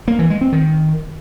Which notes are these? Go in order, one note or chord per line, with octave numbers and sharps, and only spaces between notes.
A#3
E3
G#3
C4
D#3